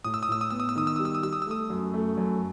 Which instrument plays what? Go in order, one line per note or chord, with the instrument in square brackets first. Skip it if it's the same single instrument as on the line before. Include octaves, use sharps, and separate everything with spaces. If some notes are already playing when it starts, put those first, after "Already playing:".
[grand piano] A2 [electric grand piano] D#6
[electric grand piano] E6
D#6
[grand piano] A2 [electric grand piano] E6
[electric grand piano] D#6
[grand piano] B3 [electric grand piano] E6
[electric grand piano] D#6
E6
[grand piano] D#3 [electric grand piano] D#6
[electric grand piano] E6
[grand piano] G3 [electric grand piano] D#6
[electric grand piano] E6
D#6
[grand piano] G3 [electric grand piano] E6
[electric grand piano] D#6
E6
[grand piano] A3 [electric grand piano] D#6
[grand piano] F#2
A3
F#2